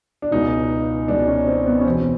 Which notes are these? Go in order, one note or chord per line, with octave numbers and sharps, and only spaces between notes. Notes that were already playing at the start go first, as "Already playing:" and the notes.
D4
C#2 B2 D#4
C#2 B2 D4
C#4
C4
B3
C#4
E2 B2 C4